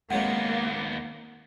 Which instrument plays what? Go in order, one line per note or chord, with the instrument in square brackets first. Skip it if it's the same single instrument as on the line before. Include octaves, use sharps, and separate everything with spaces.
[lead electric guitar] D#2 B3 [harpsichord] C3 F#3 G#3 [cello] A#3 [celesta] F#5